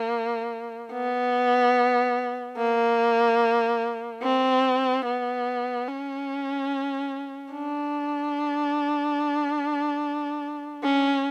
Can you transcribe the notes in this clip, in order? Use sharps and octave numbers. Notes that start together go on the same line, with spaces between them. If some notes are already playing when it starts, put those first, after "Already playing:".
Already playing: A#3
B3
A#3
C4
B3
C#4
D4
C#4